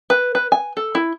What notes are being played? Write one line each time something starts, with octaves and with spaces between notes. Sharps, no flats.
B4
B4
G#5
A4
E4